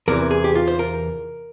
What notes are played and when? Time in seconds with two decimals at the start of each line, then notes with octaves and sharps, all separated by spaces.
0.08 E2 C3 E3 A#4
0.31 G#4
0.44 G4
0.55 F4
0.68 C5
0.79 A#4